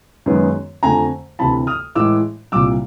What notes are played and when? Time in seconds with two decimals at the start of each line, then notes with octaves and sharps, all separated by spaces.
0.26 F#2 D#3 G#3 B3
0.83 F2 D3 F3 A3 G#5 A#5
1.39 D2 C3 E3 A5 B5
1.67 D#6 F6
1.95 A2 E3 G#3 D6 E6
2.52 C2 A#2 G3 D6 E6